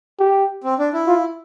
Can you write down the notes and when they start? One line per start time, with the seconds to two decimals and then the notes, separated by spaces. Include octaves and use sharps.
0.19 G4
0.64 C4
0.79 D4
0.94 E4
1.07 F4